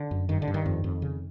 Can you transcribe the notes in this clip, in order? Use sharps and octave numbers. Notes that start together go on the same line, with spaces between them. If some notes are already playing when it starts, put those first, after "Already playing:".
Already playing: D3
F#2
G2 D#3
D3
G2
D#3
F2
F2
C#3